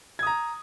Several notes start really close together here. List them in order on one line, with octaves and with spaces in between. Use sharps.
G#6 D#6 A#5